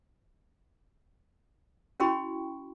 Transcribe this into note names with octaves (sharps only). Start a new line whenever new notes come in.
C#4 E4 F#4 G5 B5 C#6